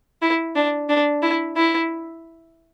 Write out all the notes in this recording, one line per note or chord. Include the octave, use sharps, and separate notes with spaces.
E4
D4
D4
E4
E4